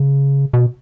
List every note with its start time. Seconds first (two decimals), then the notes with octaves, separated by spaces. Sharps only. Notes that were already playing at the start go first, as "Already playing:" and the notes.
Already playing: C#3
0.53 B2